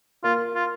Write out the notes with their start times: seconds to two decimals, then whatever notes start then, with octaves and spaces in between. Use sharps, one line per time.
0.24 A#3 F4
0.55 F4